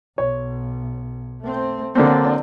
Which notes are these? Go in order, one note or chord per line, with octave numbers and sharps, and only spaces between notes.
B1 C#5
A3 C4
D3 F#3 A#3 C4 D4